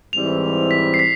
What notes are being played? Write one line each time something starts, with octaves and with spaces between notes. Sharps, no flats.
G#2 E3 G3 C4 E4 F7
B6
C7
B6